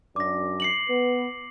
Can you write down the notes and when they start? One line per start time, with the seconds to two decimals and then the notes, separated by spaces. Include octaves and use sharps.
0.16 F#2 D4 D6 A#6
0.60 C7 C#7 F#7
0.89 B3 B4